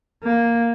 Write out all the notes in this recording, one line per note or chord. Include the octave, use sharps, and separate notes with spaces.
A#3